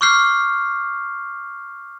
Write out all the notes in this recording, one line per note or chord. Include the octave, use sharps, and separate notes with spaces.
C#6 D6 F6 G6 C7